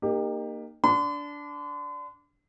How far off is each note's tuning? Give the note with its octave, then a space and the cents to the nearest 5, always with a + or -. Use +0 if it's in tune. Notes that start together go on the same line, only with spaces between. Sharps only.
A#3 -5 D#4 -30 G4 +20
D4 -15 C6 -45